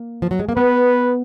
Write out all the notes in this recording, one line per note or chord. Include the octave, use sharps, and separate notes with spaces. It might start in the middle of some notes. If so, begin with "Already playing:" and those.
Already playing: A#3
F3
F#3
G#3
A#3
B3 B4